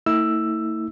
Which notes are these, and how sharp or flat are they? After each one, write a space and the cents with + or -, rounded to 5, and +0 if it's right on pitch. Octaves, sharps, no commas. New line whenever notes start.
A3 +45 E4 -35 E6 +10